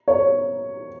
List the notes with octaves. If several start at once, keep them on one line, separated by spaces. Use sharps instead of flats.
C#5